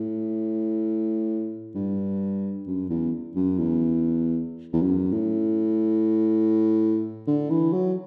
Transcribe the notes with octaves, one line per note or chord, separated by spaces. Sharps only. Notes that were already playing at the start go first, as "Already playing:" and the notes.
Already playing: A2
G2
F#2
E2
F#2
E2
E2
F#2
A2
D3
E3
F#3